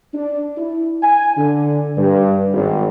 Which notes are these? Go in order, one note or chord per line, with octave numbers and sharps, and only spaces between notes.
D4
E4
G#5
D3
G2
G#1